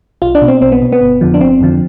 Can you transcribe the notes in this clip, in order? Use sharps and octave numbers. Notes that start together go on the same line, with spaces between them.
B1 F4
D4
B2
C4
B1 C4
B3
B2
B3
G1
F2 D3 F3
D4
G1 C4
F2 D3 F3